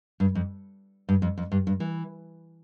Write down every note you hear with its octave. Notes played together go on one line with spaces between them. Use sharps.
G2
F2
G2
F2
F2
G2
G2
E3